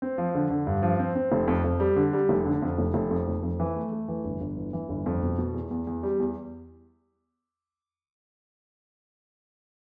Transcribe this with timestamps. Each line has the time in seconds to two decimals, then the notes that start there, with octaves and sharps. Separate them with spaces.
0.02 C4
0.18 F3
0.35 D3
0.50 D3
0.67 G2
0.83 F3
0.99 C4
1.15 C4
1.32 F1
1.47 F2
1.64 F2
1.80 G3
1.96 D3
2.13 G3
2.29 F1
2.45 D3
2.62 F2
2.78 F1
2.94 F1
3.11 F2
3.27 F1
3.43 F2
3.60 E3
3.76 A3
3.92 A3
4.08 E3
4.25 G1
4.41 G1
4.56 E3
4.73 E3
4.89 G1
5.06 F2
5.22 B2
5.38 B2
5.54 E2
5.71 E2
5.87 E2
6.03 G3
6.20 E2